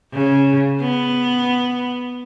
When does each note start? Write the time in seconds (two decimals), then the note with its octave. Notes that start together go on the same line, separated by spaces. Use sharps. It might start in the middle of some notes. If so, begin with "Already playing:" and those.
0.12 C#3
0.81 B3